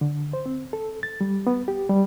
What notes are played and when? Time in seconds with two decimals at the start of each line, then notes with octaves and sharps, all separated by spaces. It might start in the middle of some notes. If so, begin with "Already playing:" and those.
0.01 D3
0.33 C5
0.46 C4
0.73 A4
1.03 A6
1.21 G3
1.47 B3
1.68 G4
1.89 G3